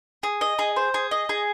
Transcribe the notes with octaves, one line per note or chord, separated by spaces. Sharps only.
G#4
D#5
G#4
C5
G#4
D#5
G#4